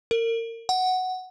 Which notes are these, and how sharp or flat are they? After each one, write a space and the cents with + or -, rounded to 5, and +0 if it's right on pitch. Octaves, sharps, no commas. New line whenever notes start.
A#4 -30
F#5 +5